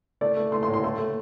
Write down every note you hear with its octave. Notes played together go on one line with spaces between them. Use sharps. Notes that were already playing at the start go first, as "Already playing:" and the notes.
A3 D5
A3
A3 C6
C6
A2
C6
A3 C6
A3